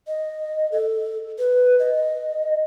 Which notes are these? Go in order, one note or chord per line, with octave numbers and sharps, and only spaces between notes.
D#5
A4
B4
D#5